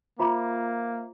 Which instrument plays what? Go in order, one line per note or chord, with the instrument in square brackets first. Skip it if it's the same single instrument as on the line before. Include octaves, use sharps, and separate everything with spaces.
[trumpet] A#3 [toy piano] F4 A#5 D6 [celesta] C5 E5